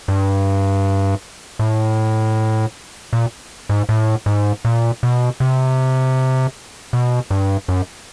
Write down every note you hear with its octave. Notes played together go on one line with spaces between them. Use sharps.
G2
A2
A#2
G#2
A2
G#2
A#2
B2
C3
B2
G2
F#2